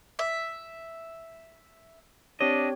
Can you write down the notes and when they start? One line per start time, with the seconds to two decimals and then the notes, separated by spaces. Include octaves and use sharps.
0.19 E5
2.40 C4 D4 G4 C#5 D#5